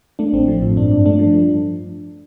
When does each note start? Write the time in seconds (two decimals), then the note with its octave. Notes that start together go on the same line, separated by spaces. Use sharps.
0.19 A3 D4
0.33 A1 C4
0.48 F3
0.62 A2
0.77 G2 D4
0.91 G2
1.06 A3 D4
1.19 F3